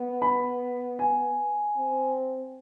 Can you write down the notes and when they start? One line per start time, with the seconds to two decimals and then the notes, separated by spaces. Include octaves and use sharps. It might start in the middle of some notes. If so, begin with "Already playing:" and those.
Already playing: B3
0.22 B5
0.99 G#5
1.77 C4